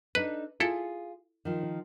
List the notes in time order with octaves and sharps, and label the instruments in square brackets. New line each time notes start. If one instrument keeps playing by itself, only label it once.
[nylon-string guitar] D4 D#4 A4 [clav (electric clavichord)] B4
[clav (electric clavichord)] E4 A4 [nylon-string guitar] F4 G#4
[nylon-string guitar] D#3 F3